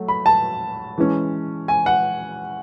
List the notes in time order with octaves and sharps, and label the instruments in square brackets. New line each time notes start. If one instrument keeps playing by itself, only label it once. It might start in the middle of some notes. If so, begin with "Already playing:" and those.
Already playing: [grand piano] F#3 A3
B5
A5
E3 G#3 C#4
G#5
F#5